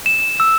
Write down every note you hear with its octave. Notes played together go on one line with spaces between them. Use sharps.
E7
E6